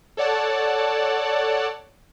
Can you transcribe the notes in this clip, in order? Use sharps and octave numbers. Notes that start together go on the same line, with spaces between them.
A4 C#5 D5 F#5 A5